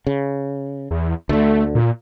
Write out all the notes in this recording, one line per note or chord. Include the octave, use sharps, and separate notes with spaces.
C#3
E2
D2 D3 A3
A#2